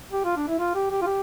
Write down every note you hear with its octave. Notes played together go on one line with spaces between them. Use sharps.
G4
F4
D4
E4
F4
G4
G4
F4
G4